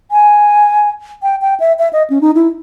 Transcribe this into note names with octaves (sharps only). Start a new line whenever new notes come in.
G#5
G5
G5
E5
E5
D#5
C#4
D#4
E4